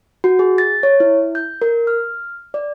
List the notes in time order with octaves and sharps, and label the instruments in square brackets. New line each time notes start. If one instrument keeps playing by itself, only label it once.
[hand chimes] F#4
G#4
A6
C#5
E4
G6
A#4
F6
D5